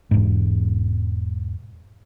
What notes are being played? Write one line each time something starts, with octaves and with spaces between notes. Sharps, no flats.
E1 G#2